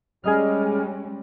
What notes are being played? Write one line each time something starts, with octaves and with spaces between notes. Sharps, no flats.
G3 G#3 C#4 G#4 D#5 F6